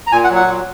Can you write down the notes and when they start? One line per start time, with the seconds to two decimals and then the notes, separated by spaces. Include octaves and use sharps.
0.07 A#5
0.12 A#2 G#5
0.24 F#5
0.30 F#3
0.36 F#5
0.47 A#2